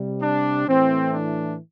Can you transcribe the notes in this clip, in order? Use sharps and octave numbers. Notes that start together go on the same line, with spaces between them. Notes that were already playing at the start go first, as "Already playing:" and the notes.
Already playing: C3 G3
D4
A2 E3 A3 C4
D4